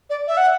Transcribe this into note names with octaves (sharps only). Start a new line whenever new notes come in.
D5
E5
F#5